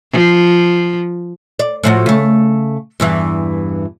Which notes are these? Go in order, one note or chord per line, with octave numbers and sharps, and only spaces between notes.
F3
D5
A2 F3 F#4
C#3 A3
E2 G2 E3